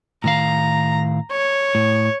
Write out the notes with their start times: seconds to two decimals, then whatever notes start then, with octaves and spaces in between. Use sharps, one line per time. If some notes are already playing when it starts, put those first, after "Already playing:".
0.24 A2 D#3 F5 A#5
1.32 C#5
1.75 A2